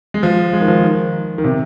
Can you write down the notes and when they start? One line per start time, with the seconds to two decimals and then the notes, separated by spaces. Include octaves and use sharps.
0.14 G#3
0.23 F3
0.53 G#3
0.61 D#3
0.68 F3
0.84 D#3
1.38 D#3
1.44 C3